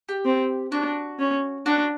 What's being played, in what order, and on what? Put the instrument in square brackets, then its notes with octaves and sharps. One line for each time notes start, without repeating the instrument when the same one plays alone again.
[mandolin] G4
[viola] C4
[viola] D4 [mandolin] F#4
[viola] C#4
[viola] D4 [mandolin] F#4